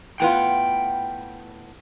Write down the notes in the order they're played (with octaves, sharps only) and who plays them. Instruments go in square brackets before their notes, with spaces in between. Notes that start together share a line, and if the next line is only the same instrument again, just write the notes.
[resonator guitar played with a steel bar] A2 B3 F4 [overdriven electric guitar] G5